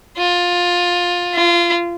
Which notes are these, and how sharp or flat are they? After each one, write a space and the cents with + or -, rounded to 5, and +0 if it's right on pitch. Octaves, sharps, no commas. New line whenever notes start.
F4 +15
F4 -25